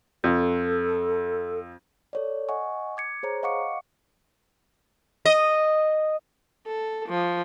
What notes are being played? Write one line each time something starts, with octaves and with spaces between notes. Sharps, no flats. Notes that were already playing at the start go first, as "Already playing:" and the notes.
F2 A4
A4 C#5 D5
D#5 F#5 G#5 C#6
D6 G#6 C#7
G#4 C5 C#5 A#5
D#5 F5 F#5 C#6 D6 C#7
D#5
A4
F3